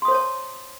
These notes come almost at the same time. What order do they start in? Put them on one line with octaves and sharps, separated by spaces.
C6 D#6 C5 C#5 A5